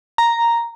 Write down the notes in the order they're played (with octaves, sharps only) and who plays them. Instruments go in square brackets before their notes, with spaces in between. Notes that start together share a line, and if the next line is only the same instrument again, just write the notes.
[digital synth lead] A#5